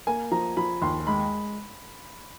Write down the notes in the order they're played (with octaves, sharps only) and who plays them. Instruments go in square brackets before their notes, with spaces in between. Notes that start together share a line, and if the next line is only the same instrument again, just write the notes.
[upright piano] A#3 [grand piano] G#5
[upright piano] F3 [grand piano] A#5
[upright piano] F3 [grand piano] B5
[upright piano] D#2 [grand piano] C6
[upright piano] G#3 [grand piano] B5